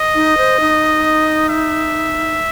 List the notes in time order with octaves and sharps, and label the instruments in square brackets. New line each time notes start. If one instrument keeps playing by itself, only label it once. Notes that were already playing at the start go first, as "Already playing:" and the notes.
Already playing: [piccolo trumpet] D#5
[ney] D#4
C5
D#4
[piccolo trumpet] E5